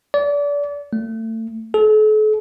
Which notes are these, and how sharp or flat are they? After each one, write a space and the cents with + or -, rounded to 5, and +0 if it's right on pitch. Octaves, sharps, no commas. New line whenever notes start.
D5 -30
A3 +30
A4 -40